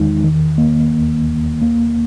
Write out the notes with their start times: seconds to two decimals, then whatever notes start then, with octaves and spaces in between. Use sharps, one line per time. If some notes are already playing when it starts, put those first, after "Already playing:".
Already playing: E2 D#3 G#3 D#4
0.24 D#3
0.58 A#3
0.93 D#2
1.28 D#2
1.62 A#3